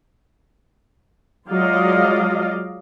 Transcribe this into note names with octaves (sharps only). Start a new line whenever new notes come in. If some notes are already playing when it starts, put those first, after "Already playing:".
F#3 G#3 F4 D5 D#5 F5